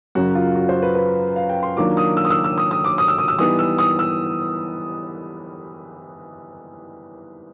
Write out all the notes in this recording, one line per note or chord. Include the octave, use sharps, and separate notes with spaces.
F#2 C#3 F#3 F#4
F4
F#4
C5
B4
B4
F5
G5
C6
D#3 F#3 A#3 D4 F4 D6
D#6
E6
D#6
E6
E6
D#6
D#6
D6
D#6
E6
D#6
E6
E3 G3 B3 D#4 D#6
E6
D#6
E6